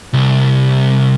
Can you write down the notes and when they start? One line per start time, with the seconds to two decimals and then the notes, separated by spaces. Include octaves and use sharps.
0.13 C2